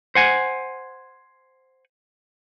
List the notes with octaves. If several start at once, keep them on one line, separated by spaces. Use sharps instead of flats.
C5 F#5 G#5